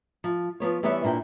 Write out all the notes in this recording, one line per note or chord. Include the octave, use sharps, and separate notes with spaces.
F3
F3 B3 C#5
E3 G3 B3 B4 C#5 E5
A#2 D4 E4 G5